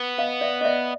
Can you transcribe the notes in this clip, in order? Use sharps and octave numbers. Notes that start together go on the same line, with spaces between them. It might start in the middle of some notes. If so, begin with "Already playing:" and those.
Already playing: B3
D#5 F5
D5 E5
D#5
D5 E5